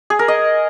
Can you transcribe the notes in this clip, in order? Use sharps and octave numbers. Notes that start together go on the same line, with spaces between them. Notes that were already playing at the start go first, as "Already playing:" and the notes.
G#4
A#4
D#5